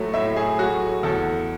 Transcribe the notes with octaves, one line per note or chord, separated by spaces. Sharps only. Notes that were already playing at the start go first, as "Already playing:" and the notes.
Already playing: A2 F#3 A3
A2 E5
G#4
F#3 A3 F#4
E2 A4